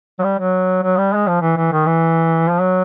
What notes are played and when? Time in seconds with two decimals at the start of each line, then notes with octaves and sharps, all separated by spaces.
0.19 F#3
0.24 G3
0.39 F#3
0.83 F#3
0.97 G3
1.13 G#3
1.28 F3
1.42 E3
1.57 E3
1.72 D#3
1.86 E3
2.50 F3
2.61 F#3